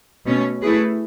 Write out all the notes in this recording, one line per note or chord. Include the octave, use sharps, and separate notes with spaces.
B2 A3 C#4
A3 E4 G#4 B4